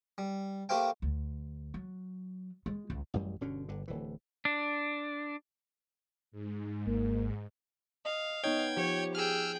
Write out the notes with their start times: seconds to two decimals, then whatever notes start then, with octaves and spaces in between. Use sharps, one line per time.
0.18 G3
0.69 A3 A#3 G4 C5 F5 G5
1.02 D2
1.74 F#3
2.66 G#3
2.90 C#2
3.14 A1 F#2 G3
3.41 G1 B2 D3 C#4
3.69 G1 D3
3.88 D1 E3
4.45 D4
6.32 G#2
6.87 G#1 A#3
8.05 D#5 F5
8.44 B3 D#4 C#5 D#5 G5 G#6
8.77 F3 G4 C#5
9.15 G#4 G5 E6 F6